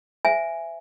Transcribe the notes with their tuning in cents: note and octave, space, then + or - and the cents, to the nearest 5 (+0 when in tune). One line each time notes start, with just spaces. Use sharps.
C5 -40 E5 +15 G#5 +0